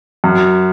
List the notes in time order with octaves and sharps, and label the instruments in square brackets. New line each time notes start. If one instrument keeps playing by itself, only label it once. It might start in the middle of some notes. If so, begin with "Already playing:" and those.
[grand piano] F#2